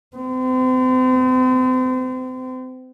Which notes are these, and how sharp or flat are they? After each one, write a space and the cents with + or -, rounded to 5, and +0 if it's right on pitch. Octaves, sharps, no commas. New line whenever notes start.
C4 -35